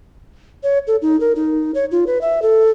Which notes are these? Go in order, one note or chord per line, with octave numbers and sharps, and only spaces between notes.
C#5
A4
D#4
A#4
D#4
C#5
F4
B4
E5
A4